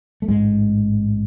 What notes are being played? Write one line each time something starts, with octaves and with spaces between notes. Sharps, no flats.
A3
A1 G#2 G#3